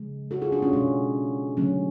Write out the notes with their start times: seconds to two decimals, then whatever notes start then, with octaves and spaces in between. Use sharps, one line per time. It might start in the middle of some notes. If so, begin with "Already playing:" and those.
Already playing: C#3 F3 G#3
0.31 F#4 A4
0.42 F4 G#4
0.52 D4 F#4
0.62 C#4 F4
0.73 B2 G#3 C#4
1.57 D3 F#3 A3 C#4